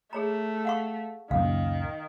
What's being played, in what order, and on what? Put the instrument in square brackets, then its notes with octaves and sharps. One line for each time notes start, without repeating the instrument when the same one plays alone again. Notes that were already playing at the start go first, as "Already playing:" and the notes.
[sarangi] A3 [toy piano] G#4 C#5 A#5
[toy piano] F5 F#5 C#6
[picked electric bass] C#2 F#2 A#2 [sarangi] D#3 [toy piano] F5